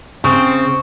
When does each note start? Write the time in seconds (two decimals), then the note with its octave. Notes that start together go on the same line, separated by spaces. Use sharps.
0.24 C#3 C4 C#6